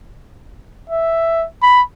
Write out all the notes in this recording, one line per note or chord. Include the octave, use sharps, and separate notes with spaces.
E5
B5